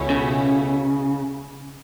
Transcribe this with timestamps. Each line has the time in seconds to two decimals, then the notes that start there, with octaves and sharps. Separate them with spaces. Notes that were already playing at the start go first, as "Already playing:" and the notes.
Already playing: C#2 B2 A3 C#4 E4
0.10 C#3